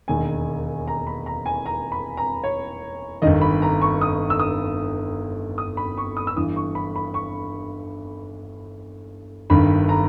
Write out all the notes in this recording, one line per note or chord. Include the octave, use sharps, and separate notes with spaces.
E1 D#2 D#3 G#5
A#5
B5
A#5
G#5
A#5
B5
A#5
C#5
G1 G2 D#3 D#5
B5
A#5
C#6
D#6
E6
D#6
D#6
B5
C#6
D#6
E6
G1 G2 E3 D#6
C#6
B5
B5
C#6
G1 G2 D#3 B5
A#5